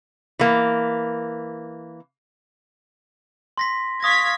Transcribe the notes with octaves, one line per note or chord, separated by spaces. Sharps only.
E3 A#3
C6 A#6 B6
F5 C#6 D#6 G#6 A#6 B6